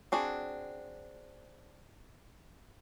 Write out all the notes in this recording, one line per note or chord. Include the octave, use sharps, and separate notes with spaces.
C4 D4 F#4 G#4